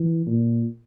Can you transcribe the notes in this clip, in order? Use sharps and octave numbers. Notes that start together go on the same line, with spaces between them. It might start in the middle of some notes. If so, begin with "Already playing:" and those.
Already playing: E3
A#2